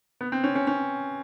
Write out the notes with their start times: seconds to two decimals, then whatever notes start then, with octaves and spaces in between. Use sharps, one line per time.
0.21 B3
0.32 C4
0.44 C#4
0.55 C#4
0.67 C#4